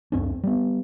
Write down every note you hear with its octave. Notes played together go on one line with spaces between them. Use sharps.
C#2 F#2 C4 D4
G3 B3